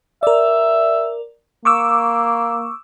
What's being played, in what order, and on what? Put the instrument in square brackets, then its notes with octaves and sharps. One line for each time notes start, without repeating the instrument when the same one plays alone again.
[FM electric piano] A#4 D5 [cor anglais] E5
[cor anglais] A#3 [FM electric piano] C#6 D6 E6